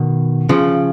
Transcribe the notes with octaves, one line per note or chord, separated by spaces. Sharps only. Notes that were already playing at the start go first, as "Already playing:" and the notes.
Already playing: B2 D#3
C#3 F3